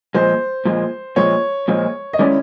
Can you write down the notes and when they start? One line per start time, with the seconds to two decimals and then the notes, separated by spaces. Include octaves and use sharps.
0.15 A#2 F3 G#3 C5
0.65 A#2 F3 G#3
1.16 A#2 F3 G#3 C#5
1.68 A#2 F3 G#3
2.13 D#5
2.19 D#3 G#3 C#4 E4 D5